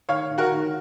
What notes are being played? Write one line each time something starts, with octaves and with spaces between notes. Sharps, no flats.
D#3 C#5 F5
D#3
F#4 A#4
D#3